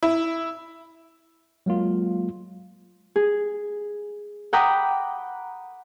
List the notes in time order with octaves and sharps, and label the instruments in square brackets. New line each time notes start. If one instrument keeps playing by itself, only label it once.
[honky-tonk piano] E4
[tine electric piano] F#3 G#3 A#3 F4
[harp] G#4
F#5 G5 A#5 B5 D6 D#6